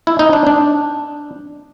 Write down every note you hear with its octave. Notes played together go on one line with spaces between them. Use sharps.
E4
D#4
D4
D4